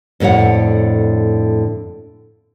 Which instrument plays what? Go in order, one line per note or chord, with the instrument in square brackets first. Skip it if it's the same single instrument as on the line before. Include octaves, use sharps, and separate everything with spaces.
[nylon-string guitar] F2 A2 D3 C#5 F#5